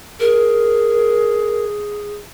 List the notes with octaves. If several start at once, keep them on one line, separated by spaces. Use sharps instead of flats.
G#4 A#4